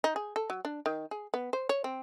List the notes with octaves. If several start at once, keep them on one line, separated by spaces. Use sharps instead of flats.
D#4
G#4
A4
F#3
D4
D#3
G#4
B3
C5
C#5
C4